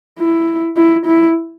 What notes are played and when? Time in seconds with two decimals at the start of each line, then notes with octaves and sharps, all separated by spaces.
0.19 E4
0.77 E4
1.06 E4